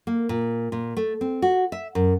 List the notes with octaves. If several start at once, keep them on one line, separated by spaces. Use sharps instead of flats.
A#3
A#2
A#2
A3
C4
F#4
E5
F#2